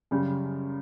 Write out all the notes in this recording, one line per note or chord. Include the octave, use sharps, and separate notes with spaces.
F#2 C#3 G3